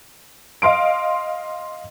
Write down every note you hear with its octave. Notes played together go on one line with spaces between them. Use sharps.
D#5 F5 C6 D7